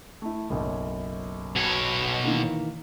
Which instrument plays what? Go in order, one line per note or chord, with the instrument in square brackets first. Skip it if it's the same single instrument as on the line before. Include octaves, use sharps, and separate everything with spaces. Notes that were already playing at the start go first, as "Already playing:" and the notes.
[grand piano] A3 E4
F#1 B1 F#2
[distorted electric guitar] B2 C#5
[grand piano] D#3 E3 A#3